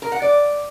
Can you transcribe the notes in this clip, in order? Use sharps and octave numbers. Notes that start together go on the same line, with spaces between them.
A#4
F#5
D5